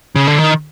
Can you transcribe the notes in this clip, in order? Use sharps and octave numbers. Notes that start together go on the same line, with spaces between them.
C#3
D3
D#3